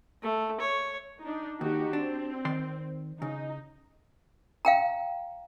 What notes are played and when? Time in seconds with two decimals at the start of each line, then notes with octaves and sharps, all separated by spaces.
0.23 A3
0.61 C#5
1.22 D4 D#4
1.61 D#2 D#4 F#4 G4
1.93 C4 D4
2.45 D#3 D5 C6
3.22 C#3 D#4
4.65 F5 G5 A#5